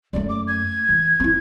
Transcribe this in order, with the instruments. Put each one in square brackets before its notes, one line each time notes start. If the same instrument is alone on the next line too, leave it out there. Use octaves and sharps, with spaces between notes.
[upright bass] F#2 A3 [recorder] D5
[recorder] D6
G#6
[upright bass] E3
C4 E4